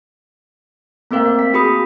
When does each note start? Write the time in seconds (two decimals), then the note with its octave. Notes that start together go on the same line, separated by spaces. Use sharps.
1.11 A3 A#3 C4 A#4 F5 G5
1.39 B6
1.54 F#4 G#4 B5 D#6